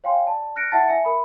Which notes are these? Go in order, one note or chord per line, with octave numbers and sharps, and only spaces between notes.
C#5 F5 G5 G#5 C6
D5 A5
F6 F#6 A#6 C#7 D7
E4 E5 F#5 A5 A6
E5 G#5 C#7
A#4 B5